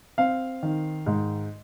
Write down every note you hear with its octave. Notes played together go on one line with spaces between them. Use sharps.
C4 F5
D#3
G#2